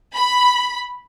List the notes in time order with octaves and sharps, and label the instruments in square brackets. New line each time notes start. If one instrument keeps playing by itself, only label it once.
[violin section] B5